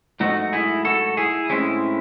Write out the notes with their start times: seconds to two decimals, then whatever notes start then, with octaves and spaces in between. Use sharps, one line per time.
0.20 G#2 F#3 A3 D#4 F#4
0.53 E4 G#4
0.85 F#4 A4
1.17 E4 G#4
1.50 A2 G#3 C4 C#4 E4